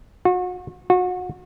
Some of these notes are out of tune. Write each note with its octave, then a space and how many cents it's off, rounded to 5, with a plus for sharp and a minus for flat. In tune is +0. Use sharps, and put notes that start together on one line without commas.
F#4 -35
F#4 -30